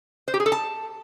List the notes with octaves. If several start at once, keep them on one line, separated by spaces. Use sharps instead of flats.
C5
G4
G#4
A4
A5